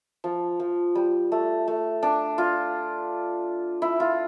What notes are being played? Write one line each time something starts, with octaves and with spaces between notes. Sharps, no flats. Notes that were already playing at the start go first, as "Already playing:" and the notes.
F3
F3
G3
A3
A3
D4
F4
E4
F4